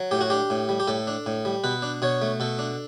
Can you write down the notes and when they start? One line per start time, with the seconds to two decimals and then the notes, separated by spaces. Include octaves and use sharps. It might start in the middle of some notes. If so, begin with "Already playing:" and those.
Already playing: F#3
0.11 A2 G4
0.21 F#4
0.30 D4 G4
0.50 A2
0.69 G3
0.80 G4
0.87 A2 A4
1.07 D4
1.26 A2
1.45 G3
1.64 B2 B4
1.82 D4
2.02 B2 C#5
2.22 A3
2.40 B2 A4
2.59 D4